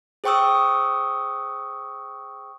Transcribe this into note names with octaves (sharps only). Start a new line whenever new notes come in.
G#4 C5 G5 C#6 D#6 E6